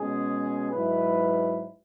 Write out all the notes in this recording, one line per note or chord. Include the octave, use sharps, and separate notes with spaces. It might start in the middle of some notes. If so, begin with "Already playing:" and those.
Already playing: B2 G#3 C#4 G#4
G#2 F#3 E4 B4